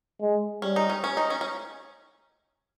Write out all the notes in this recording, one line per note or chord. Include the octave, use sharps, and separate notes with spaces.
G#3
G3 C#4
D#4
C#4
C#4
D#4
C#4
C#4